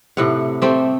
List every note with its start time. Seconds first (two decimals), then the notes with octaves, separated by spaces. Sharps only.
0.17 A2 C3 F#5
0.62 A3 C4 G4